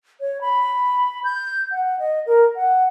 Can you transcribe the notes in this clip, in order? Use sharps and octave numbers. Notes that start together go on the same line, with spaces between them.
C#5
B5
G6
F#5
D#5
A#4
F#5